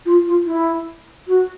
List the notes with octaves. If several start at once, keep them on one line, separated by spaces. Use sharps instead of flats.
F4
F4
E4
F#4